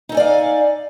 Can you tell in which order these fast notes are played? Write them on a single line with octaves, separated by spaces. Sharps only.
D#4 A4 G#5 D5 F5